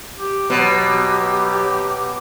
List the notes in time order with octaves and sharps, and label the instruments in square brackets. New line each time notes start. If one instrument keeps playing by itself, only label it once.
[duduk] G4
[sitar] B2 [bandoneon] F#3